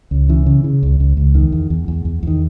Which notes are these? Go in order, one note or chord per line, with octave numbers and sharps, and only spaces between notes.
C#2
C#3 E3
C#3
C#3
C#2
C#2
C#2
E2 D#3
E2
E2
E2
E2
E2 D#3